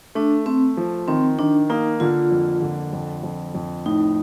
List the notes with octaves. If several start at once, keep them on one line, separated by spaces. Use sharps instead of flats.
A3 D4
A3 C4
F3
D#3 C4
D#3 D4
A#3 D#4
D3 F4
F2
D3
F2
F2
F2
A2 D#4